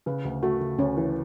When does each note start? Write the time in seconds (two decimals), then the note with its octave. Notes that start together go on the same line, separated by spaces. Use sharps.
0.06 C#3 B4
0.25 D2
0.42 A3 F#4
0.61 C#3
0.79 D2 C#4
0.97 E3